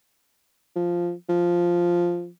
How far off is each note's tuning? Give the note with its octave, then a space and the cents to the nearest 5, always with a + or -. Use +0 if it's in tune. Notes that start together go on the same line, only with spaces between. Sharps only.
F3 -5
F3 +0